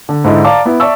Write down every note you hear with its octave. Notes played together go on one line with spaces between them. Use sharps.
D3
G#2 D3 D#4 E4
D5 F5 A5 A#5 D6
B3 E4
D5 E5 A5 C#6 E6